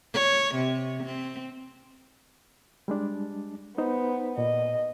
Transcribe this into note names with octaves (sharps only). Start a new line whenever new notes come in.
C#5
C3
C4
G3 G#3 D4
B3 D#4 C5
A#2 D#5